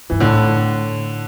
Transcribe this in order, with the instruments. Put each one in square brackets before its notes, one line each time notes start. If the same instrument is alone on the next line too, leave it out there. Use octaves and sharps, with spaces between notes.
[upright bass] G2 [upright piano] E3
[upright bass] A2 [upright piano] D3